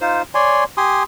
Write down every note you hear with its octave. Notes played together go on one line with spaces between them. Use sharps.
D#4 F4 C5
C#5 D5 G#5 C6
G4 G#5 C6 D#6